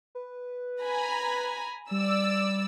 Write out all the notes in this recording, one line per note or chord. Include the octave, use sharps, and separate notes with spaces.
B4
G#5 A#5 B5
G3 D5 E6